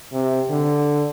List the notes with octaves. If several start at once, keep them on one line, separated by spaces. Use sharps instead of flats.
C3
D3